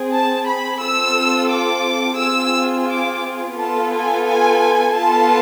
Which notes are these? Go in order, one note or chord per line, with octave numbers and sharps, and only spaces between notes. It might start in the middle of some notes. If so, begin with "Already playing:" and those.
Already playing: C4 G#4
A5
B5
C4 F4 A4 E6
D6
C4 F4 G#4 E6
D6
B3 F4 A4 A5
G#5
G#5
B3 F4 A4 A5